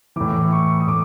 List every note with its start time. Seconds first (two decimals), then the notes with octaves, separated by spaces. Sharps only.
0.16 A2 E3 D6
0.52 C#6
0.80 D#6
0.87 A2 D6